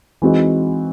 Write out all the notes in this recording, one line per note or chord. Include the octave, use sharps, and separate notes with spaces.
E3 G#3 C4 D#4 F#4